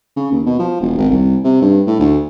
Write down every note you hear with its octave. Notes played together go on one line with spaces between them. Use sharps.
C#3
D#2
B2
F3
E1
G#1
C2
C3
G2
A2
D2